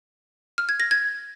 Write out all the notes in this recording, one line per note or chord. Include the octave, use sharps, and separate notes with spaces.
F6
G#6
A#6
G#6